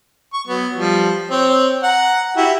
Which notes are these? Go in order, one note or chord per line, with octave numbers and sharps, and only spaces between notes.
C#6
F#3 B3
F3 G3 F4
C4 C#5
F#5 A#5
E4 F#4 G4